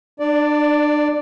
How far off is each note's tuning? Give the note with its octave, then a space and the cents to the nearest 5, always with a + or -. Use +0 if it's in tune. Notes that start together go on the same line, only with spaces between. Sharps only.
D4 +30 D5 +0